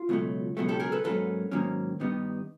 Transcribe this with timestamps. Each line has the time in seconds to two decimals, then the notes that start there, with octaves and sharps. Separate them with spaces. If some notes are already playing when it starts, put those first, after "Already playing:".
Already playing: F4
0.09 C#2 B2 F#3 A3
0.57 C#2 B2 F#3 A3
0.68 G4 A4
0.80 G#4 A#4
0.92 A4 B4
1.04 G#2 D#3 F#3 A#3 C#4 A4 B4
1.51 G#2 D#3 F#3 A#3 C#4
2.00 G2 D#3 G3 B3 D#4